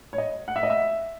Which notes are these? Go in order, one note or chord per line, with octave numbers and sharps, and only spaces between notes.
C#5
D#5
F#5
E5
D#5
E5